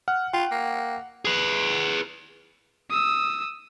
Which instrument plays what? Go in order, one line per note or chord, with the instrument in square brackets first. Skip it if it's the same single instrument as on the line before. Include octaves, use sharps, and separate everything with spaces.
[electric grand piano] F#5 [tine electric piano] F6
[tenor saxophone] F4 [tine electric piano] G5
[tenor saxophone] A#3
[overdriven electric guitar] G#4 B4
[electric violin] D#6 E6